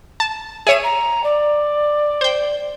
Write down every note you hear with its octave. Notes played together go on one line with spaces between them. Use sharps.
A5
G#4 C#5 E5 D#7
A#5
D5
C5 G5